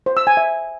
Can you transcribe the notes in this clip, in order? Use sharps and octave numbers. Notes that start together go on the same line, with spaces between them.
C5
E6
G#5
E5